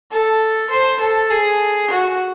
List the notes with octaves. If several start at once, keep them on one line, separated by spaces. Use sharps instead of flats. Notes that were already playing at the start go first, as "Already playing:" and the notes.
A4
C5
A4
G#4
F#4